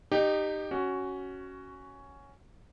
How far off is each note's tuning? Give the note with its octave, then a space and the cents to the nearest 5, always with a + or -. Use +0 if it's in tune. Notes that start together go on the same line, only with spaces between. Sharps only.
D#4 -20 G4 +5
C#4 +0 F#4 +10